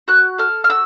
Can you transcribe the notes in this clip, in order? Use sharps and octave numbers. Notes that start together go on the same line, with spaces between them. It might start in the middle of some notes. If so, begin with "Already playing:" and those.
F#4 F#6
A4 F6
F6
F#4 E6